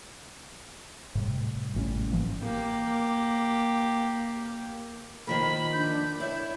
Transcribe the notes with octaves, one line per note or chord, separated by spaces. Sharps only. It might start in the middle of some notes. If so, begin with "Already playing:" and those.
A2 C3 G3
G#1 A2 G3 C#4
G#1 E3 F3 A#3
A#3 G4
D#3 F3 A#3 B5
D4 G6
E4 C#5 E5